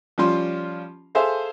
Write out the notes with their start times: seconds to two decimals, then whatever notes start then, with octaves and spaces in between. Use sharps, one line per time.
0.18 F3 G3 C#4 F4 C6
1.15 G#4 A4 C5 E5 F5